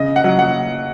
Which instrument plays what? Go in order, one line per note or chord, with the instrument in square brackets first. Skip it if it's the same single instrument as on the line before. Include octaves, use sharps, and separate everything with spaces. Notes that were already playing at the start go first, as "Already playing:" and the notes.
Already playing: [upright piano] C#3 D#5
F#5
F#3
F#5